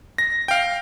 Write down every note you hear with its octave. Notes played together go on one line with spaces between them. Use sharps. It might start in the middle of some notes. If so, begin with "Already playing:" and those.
A#6
F5 G5